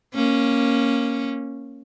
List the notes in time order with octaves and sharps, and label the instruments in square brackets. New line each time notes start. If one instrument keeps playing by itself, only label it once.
[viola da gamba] A#3 C#4